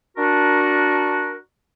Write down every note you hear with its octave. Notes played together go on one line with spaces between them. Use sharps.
D4 F#4 A#4